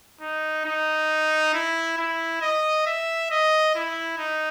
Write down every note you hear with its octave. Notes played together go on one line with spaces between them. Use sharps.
D#4
D#4
E4
E4
D#5
E5
D#5
E4
D#4